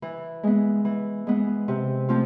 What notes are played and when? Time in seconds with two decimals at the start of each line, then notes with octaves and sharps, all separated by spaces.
0.02 E3
0.43 G#3 B3
0.85 E3
1.27 G#3 B3
1.68 C3
2.09 F3 A3 C4 F4